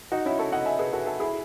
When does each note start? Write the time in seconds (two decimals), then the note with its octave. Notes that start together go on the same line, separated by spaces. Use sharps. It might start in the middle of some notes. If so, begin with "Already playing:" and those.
0.12 D#4 F#4
0.25 C#4 E4
0.38 A4 C#5
0.52 D#5 F#5
0.66 E5 G#5
0.79 G#4 B4
0.93 F#4 A4
1.06 F#4 A4
1.20 E4 G#4